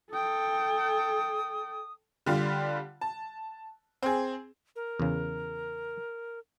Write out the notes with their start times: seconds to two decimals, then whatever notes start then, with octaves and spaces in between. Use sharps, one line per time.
0.12 A4 G5 D#6
2.26 D3 G3 F4
3.01 A5
4.03 C4 G#4
4.76 A#4
5.00 E2 C#3